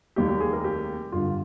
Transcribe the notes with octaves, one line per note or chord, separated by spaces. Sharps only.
F1 D#2 D#3 G3 A#3 G4
G4
G#4
A#4
G4
G1 G2 D3 F4